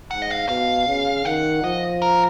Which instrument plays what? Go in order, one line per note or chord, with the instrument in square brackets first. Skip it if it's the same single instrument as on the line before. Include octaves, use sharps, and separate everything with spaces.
[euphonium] G#2 [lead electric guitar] F#5
[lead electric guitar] D#5
F5
[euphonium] B2 [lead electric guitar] F5
[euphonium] C#3
[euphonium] D#3 [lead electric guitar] F#5
[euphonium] F3 [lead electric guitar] D#5
[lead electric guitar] A#4